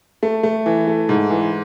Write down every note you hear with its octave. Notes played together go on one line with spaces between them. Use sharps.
A3
A3
E3
A3
G#2
E3